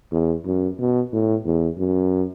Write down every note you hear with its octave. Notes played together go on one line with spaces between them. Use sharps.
E2
F#2
B2
A2
E2
F#2